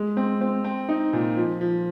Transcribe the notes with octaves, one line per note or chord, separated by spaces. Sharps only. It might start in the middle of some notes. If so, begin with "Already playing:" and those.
Already playing: G#3
C4
C4
C4
D#4
A#2
F3
F3